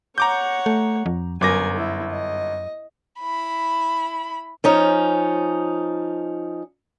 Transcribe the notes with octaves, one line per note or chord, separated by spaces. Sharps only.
C#5 F#5 A#5 D6 G6
A3
F2
G1 F#2 A#4 G#5 D6 A#6
E4
D#5
E4 B5
F3 C#4 D#4